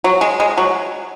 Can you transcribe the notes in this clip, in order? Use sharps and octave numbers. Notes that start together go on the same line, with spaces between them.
F#3
G#3
G#3
F#3